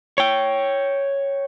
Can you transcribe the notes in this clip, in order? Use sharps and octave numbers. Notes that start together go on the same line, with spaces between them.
C#5 G5